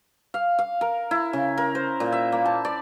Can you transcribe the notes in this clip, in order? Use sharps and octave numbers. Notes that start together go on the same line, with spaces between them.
F5
F5
A#4
E4
C#3
A#4
C5
A#2
E5
A#3
A5
D5